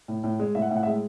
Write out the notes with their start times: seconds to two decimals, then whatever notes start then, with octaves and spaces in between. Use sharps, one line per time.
0.08 A2
0.24 A2
0.39 G#3
0.55 A2 E5
0.62 F#5
0.69 A2 E5
0.76 F#5
0.83 E5
0.86 G#3